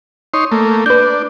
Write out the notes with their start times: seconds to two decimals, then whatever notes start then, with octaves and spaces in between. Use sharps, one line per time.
0.34 D#4 C#5 C6
0.52 A3 A#3
0.86 D4 B4 G6